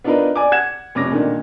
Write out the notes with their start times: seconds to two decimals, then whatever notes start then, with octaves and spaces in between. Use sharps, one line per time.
0.04 B3 D4 D#4 F4 A#4 B4
0.36 D5 G#5 D6
0.52 F#5 G#6 E7
0.95 F1 C#4 D6 A#6
1.11 A#2 D3 D#3